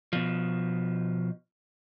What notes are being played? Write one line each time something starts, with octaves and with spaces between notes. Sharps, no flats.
B2 F3